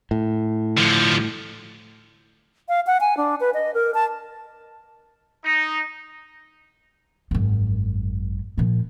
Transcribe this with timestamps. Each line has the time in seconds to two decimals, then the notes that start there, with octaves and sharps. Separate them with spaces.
0.11 A2
0.78 D3 F3
2.69 F5
2.87 F#5
3.00 G#5
3.17 D4
3.40 B4
3.54 D#5
3.74 A#4
3.94 A5
5.44 D#4
7.31 G#1 F#2
8.58 A#2 F3